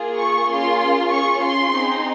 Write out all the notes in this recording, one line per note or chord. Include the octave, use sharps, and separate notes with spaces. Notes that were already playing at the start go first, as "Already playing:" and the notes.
Already playing: A#3 F4 G#4
C#6
A#3 C#4 F4 G#4 C6
C#4 F4 G#4 C#6
C6
C4 D#4 G#4